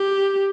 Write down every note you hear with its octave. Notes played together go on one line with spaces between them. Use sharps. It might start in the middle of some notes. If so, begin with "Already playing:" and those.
Already playing: G4